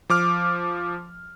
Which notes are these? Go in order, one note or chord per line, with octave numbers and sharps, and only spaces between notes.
F3 D6 F6